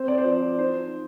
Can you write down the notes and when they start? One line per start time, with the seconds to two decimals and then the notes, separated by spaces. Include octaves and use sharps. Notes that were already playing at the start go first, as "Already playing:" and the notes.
Already playing: C4 C5
0.08 D5
0.18 C5
0.25 F3 D5
0.42 D5
0.59 D#4 C5